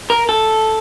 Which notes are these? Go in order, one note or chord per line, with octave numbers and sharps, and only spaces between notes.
A#4
A4